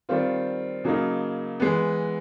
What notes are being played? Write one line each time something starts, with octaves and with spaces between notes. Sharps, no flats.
D#3 G3 C4 F4
C#3 F#3 A#3 D#4
E3 G#3 B3